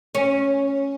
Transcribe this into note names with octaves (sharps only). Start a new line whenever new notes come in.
C#4